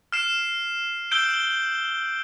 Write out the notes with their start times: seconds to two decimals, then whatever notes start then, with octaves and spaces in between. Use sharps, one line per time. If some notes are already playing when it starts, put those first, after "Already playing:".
0.12 F6 C7 E7
1.11 E6 G6 D7 G7